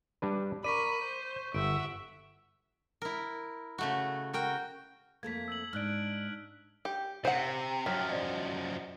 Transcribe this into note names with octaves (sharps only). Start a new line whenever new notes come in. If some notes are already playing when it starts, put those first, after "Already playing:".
G3 D4 B4
A#4 D5 B5 C#6 B6 D#7
C5
G1 E5 F#5 D7
E4 A#4
C#3 A3 F#4
F#4 A#4 G5
F2 A3 A#3 G#6 B6
E6 G#6 F#7
G#2 D4 F6 F#6 D7
G4 G5
C3 C5 F#5
F#2 F3 F#3 G5 F6 B6
C5 D5 D#5